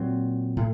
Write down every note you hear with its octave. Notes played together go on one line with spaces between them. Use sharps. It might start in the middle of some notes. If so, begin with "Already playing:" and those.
Already playing: A#2 F#3 C4
A2